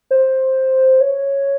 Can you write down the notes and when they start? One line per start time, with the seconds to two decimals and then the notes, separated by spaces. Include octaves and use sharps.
0.11 C5
1.01 C#5